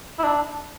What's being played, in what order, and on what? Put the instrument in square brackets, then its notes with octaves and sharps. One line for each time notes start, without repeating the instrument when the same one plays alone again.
[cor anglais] E4
D4